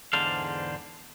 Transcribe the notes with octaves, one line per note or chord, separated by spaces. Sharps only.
E2 G#2 D3 D4 C5 F5